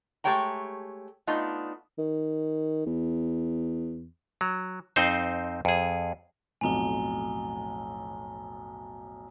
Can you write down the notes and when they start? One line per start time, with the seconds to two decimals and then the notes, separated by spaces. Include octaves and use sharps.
0.24 G#3 A3 G4 C#5 G5 A#5
1.27 A3 B3 D4 D#4 F4
1.98 D#3
2.86 E2
4.41 F#3
4.96 F2 C4 D#4 C5
5.65 F2 G#4
6.61 B1 F2 A2 G#5 A#5 G7